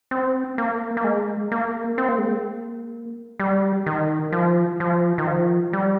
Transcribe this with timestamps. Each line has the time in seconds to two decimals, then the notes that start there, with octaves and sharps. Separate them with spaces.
0.11 C4
0.58 A#3
0.97 A#3
1.04 G#3
1.52 A#3
1.98 C4
2.09 A#3
2.18 G#3
2.28 A#3
3.40 G3
3.86 D#3
4.32 F3
4.80 F3
5.18 D#3
5.27 F3
5.73 G3